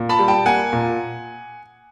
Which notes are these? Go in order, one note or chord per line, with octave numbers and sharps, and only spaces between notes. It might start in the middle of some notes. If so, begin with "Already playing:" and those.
Already playing: A#2
A5 B5
G3
G5 A5
A#3 F#5 G#5
A#2